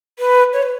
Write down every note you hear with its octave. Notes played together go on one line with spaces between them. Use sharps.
B4
C#5
B4